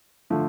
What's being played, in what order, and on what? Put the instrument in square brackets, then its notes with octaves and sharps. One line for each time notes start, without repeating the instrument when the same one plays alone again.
[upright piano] D3 F3 A3